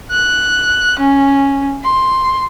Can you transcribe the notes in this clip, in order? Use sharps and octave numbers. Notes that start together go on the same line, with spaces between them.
F#6
C#4
C6